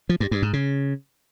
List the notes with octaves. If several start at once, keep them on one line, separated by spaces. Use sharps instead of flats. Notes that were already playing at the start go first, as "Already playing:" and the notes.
F3
G2
G2
G#2
C#3